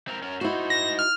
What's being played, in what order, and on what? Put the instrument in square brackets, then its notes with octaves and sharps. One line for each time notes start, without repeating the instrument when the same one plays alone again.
[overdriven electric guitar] C4 A#4
C#4 A#4
[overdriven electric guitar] D#4 C5 [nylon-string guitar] E4 F#4
[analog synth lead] A#6
F6